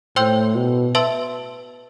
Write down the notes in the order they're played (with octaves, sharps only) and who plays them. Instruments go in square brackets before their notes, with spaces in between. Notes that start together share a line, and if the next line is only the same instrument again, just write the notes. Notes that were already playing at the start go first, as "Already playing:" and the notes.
[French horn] A2 [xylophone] C5 G5 C6 E6 G6
[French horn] B2
[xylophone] B4 E5 A5 C6 E6